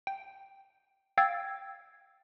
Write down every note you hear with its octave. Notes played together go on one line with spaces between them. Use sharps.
G5
F5 G5 E6 G#6 A6